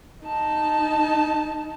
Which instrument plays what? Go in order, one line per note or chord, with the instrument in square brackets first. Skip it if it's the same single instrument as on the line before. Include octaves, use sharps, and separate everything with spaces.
[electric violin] D#4 A5